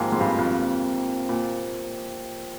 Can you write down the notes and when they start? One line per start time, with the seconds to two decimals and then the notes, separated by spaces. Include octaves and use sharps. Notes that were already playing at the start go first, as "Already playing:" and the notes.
Already playing: G#2 C3 F3 A#3
0.12 G#2
0.21 G2
0.39 F2
1.29 A#2